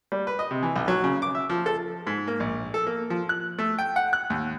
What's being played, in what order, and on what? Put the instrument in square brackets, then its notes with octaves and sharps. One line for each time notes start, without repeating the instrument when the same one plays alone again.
[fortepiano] G3
B4
D#5
C3
E3
B1
F#3
C#3
D6
E5
F3
A4
G#2
A#3
A#1
A4
A#3
F3
F#6
A3
G5
F#5
F#6
D#2